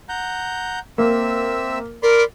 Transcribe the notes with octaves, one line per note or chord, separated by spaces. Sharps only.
F#5 A#5 G6
A#3 C4 E5 E6
A#4 D5 B5 C6